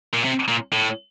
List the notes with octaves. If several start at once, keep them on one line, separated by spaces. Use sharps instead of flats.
A#2
C3
A#2
A2